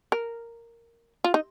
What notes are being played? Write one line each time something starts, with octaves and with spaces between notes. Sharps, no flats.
A#4
F4
D#4